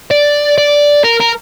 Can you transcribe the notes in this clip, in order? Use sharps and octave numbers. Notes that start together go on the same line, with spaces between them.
D5
D5
A#4
A#4